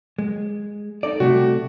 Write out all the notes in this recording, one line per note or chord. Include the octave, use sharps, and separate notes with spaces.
G#3
D#4 A4 D5
C3 G3 A3 F#4